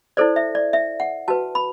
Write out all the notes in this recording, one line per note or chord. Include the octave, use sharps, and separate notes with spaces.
E4 A4 C5 D5
E5
D5
E5
F#5
F#4 B4 A5
B5